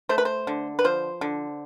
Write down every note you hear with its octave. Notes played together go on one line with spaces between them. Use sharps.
A3 C5
B4
C5
D3
B4
F3 C5
D3